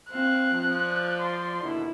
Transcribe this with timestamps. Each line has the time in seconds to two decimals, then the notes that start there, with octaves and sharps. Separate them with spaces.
0.10 C4 F5 F#6
0.52 F3
0.86 D5
1.19 C6
1.62 D#2 B2 D3 E4